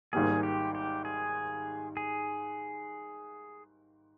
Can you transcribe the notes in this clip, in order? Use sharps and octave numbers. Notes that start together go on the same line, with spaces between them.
G#1 G#2 G3 A#3 G#4
G4
G4
G#4
G#4